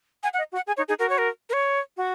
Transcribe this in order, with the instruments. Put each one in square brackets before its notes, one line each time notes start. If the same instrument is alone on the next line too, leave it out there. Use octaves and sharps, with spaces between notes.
[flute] F#5 [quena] G#5
[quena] F#5
[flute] D#5
F#4
[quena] F#5
[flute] G#4 [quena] G#5
[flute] D#4 [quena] C#5
[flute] D#4 [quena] G#4
[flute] F#4 [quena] A#4
[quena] C#5
A#4
A#4
C#5
[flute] F#4